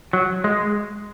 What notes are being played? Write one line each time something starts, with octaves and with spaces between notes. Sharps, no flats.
F#3
G#3